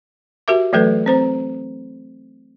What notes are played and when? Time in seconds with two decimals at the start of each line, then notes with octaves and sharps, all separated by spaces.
0.48 F#4 G4 A#4 E5 D6
0.73 E3 F#3 A3 A4 B4
1.06 C4 C5 A#5